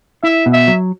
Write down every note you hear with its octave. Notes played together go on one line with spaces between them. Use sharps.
E4 E5
B2
E5
F#3